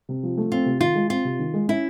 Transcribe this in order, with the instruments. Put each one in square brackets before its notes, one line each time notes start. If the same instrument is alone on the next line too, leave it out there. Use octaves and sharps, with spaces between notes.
[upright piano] C3
F3
A3
[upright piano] C4 [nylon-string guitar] F4
[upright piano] C3
[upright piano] D#3 [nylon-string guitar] F4
[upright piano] G#3
[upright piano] C4 [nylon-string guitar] F4
[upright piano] C3
D#3
G#3
[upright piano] C#4 [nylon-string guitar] E4